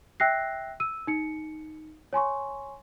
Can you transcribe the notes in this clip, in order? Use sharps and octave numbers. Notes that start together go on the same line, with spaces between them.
E5 G5 E6 F#6 A#6 C7
E6 D#7
D#4 C#7
C#5 G#5 C6 C#6